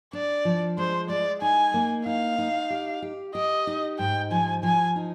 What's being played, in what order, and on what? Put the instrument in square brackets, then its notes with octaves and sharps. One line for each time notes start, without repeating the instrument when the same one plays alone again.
[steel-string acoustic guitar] D4 [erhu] D5
[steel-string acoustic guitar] F3
[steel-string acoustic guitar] G#3 [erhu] C5
[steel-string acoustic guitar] G#3 [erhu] D5
[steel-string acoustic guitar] D#4 [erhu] G#5
[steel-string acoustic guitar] A#3
[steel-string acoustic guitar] D#4 [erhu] F5
[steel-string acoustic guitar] D#4
G4
G4
[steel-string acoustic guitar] G4 [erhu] D#5
[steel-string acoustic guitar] D#4
[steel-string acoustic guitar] G#2 [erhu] G5
[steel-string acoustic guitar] F3 [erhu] G#5
[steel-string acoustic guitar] F3 [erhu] G#5
[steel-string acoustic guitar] D#4